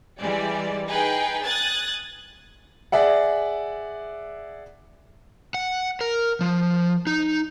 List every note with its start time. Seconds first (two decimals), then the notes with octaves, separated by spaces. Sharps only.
0.19 E3 G3 G#3 D5
0.88 D#4 G#4 B4 G5
1.44 D#6 F#6 G#6 A6
2.92 G#4 D5 E5 F#5
5.54 F#5
6.01 A#4
6.41 F3
7.07 D#4